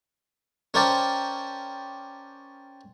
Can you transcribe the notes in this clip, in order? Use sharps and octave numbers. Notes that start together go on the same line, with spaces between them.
C#4 A#4 C5 D5 G5 A5